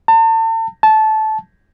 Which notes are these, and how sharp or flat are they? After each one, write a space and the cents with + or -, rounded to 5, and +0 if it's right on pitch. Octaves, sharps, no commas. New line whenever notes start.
A5 +40
A5 -15